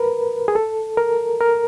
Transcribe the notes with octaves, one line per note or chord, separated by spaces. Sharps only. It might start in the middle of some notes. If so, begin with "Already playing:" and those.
Already playing: A#4 B4
G#4
A4
A#4
A#4